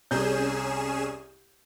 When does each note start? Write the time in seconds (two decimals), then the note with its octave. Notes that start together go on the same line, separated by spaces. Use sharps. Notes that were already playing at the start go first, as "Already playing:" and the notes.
0.11 C2 C#4 G#4 G6 E7